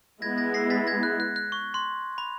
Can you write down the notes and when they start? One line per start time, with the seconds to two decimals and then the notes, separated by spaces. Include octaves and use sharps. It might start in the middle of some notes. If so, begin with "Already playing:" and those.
0.22 G#3 B3 E4 G#6 A#6
0.38 G#6 A#6
0.54 A#6 C7
0.70 A6 B6
0.87 G#6 A#6
1.03 F#6
1.20 F#6
1.36 F#6
1.52 C#6
1.74 C6
2.18 B5